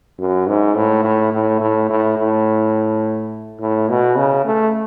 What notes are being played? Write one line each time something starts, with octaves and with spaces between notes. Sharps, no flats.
F#2
G#2
A2
A2
A2
A2
A2
A2
A2
B2
C#3
A3